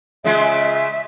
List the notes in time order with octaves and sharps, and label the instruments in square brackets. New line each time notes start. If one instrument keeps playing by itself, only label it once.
[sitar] C#3 G#3 F4 [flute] E5